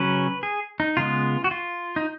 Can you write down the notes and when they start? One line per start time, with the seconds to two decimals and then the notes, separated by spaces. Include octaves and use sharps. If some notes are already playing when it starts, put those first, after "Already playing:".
Already playing: C#3 F#3 C#4 B4
0.43 G#4
0.80 D#4
0.97 C#3 G#3 B3 F4
1.44 F#4
1.51 F4
1.96 D#4